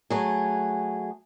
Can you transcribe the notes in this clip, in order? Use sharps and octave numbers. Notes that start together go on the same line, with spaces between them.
F#3 A3 G#4